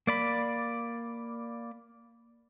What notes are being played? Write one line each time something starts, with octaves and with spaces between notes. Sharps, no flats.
A#3 D5 B5